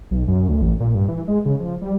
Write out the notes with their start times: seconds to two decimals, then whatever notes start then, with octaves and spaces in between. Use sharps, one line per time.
0.11 B1
0.28 F#2
0.49 D2
0.62 A1
0.80 A#2
0.95 G2
1.09 E3
1.28 G#3
1.45 C#3
1.60 F3
1.82 G3